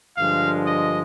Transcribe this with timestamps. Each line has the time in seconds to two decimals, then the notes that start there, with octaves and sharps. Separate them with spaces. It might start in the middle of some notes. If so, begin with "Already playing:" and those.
0.17 G2 D3 F3 G#3 F5
0.66 D#5